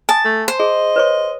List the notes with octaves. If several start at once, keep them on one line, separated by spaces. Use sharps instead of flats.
G#5 A5 D#6
A3
C5
G#4 D#5
B4 C#5 C#6